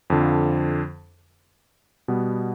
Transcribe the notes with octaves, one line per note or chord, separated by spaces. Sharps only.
F2 D3 F3
B2 G3 B3